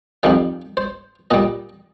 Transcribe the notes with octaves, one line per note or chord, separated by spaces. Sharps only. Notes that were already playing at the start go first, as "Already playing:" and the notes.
F2 D#3 G3 F5
C5
A#2 G3 D#5